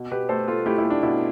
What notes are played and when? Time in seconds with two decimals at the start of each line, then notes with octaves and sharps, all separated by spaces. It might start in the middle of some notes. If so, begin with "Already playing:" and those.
Already playing: B2
0.11 B2 G4 B4
0.29 A3 A4 C5
0.48 A3 F4 A4
0.66 A3 E4 G4
0.78 E4
0.84 A3
0.90 D4
1.03 B2 E4